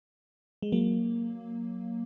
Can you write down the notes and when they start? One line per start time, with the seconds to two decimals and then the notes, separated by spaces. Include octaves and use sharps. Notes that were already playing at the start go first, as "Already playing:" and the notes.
0.62 G#3
0.72 F#3 A#3